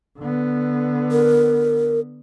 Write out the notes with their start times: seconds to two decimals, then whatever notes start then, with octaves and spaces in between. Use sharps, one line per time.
0.18 D3 B3
1.11 A#4